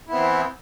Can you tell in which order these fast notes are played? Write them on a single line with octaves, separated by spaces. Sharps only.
E4 B3 C4 E3